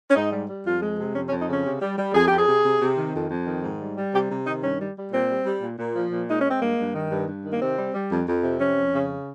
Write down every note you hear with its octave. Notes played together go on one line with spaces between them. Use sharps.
C#4
G#2 D#4
G3
G3
F2 F4
G#3
C3
F2 C#4
C#4
F2
D#4
C#3 C#4
C3
G3
G3
F2 G#4
F2 G4
G#4
C3
C3
C3
D#3
F2
F2
D#3
G#2
G3
G3
C3 G4
C3
D#3 D#4
G2 C#4
G3
G3
A#2 C4
G3
G3
A#2
A#2
F3
A#2
G#3 D#4
C#4
G#3
C4
G2 A#3
G2
D#3
G2
G2
D#3
A#3
C3 C4
G3
G3
F2
F2
C3
F2 C#4
F2
C#3